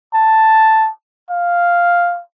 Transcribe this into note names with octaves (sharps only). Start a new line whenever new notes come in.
A5
F5